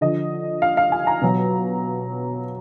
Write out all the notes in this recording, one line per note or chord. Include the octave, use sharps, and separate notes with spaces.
D3 F3 D#5
F5
F5
G#5
A#5
B2 F#3